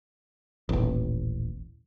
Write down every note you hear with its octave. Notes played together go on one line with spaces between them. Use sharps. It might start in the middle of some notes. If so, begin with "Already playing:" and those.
D#1 A1